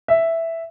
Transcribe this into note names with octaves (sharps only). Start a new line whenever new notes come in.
E5